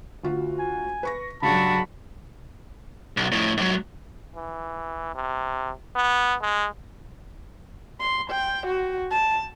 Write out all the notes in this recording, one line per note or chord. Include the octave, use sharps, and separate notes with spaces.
D2 F4 F#4
G#5
B4 C#6 A#6
C#2 G2 F#3 D4 F#4 A5 B5
B1
F2 A2
G#2 F#3
E3
C3
B3
G#3
C6
G5
F#4
A5